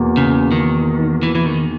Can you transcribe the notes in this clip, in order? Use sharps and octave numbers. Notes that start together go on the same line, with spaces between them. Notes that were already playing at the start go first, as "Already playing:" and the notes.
Already playing: E2 B2 A#3
C#3
D#3
E3
E3
D#3